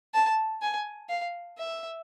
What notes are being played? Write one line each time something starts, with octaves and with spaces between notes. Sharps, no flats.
A5
G#5
F5
E5